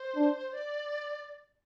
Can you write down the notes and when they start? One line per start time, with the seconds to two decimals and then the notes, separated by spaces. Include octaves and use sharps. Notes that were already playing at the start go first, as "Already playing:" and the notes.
Already playing: C5
0.16 D4
0.53 D5